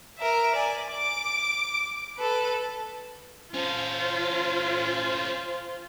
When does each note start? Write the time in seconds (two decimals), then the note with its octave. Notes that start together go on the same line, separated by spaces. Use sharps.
0.19 A#4 E5
0.55 D5 G#5
0.91 D6 D7
2.18 A4 B4
3.54 C#4 F4 A4 C5